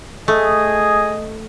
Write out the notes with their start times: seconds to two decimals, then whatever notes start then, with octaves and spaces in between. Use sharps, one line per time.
0.28 A3 G#4 D#5